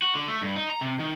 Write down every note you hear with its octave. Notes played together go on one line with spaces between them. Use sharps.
F#4
D3
A3
G2
D#4
A#5
C3
D#3